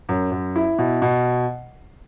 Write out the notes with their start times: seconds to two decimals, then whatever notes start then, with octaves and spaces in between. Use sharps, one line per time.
0.09 F#2
0.31 F#2
0.56 E4
0.79 B2
1.02 B2